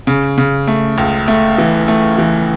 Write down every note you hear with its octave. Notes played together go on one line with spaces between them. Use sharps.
C#3
C#3
A3
C#2
A3
E3
A3
E3